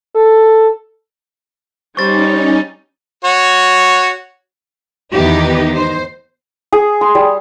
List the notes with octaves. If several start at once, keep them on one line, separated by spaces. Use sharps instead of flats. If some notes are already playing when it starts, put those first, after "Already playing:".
A4
G3 C#4 D#4 C5 C#6 A6
F#4 C#5
E2 D#3 B3 D#4 G4
C5
G#4
C6
G3